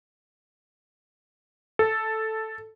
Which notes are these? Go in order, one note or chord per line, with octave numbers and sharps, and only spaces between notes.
A4